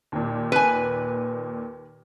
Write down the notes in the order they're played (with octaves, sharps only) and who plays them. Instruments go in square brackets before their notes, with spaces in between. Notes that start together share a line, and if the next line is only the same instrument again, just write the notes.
[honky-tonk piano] D#2 A#2
[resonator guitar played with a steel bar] B4 G#5